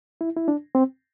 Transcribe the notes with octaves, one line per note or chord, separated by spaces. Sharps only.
E4
E4
D4
C4